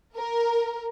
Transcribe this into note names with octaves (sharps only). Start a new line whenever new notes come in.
A#4